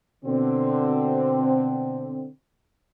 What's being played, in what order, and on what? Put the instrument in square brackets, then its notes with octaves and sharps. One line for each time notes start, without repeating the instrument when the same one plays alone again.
[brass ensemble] B2 D3 C4